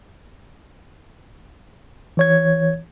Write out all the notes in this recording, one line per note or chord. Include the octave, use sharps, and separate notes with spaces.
E3 C#5 G#6